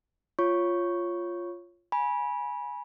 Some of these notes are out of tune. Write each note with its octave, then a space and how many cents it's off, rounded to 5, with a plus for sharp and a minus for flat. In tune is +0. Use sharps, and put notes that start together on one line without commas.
F4 +0 C#5 -5 C#6 +0
G#5 +0 B5 -25